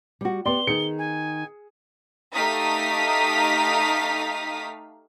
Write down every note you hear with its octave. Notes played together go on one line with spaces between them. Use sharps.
G3 F#4
B3 G4 D5 C6 G7
D#3 D#4 G#4 C#7
G#5
A3 D#4 G4 F5 D#6 B6